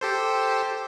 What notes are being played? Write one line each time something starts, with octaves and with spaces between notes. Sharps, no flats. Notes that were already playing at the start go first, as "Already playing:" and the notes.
G4 A4 C5